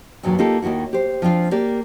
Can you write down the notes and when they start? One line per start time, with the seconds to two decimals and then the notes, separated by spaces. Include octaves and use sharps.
0.23 E2 G2 A#2 D#3 F#3
0.39 A#3 D#4 F4 G4 A4
0.62 D#2 D#3 A#3 E4 F#4
0.93 G4 C5
1.22 F3 C4 D4 F4
1.51 A#3 G4 D5